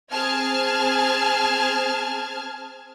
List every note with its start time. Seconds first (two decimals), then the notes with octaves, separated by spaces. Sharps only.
0.11 C4 G#4 A5 F6 G#6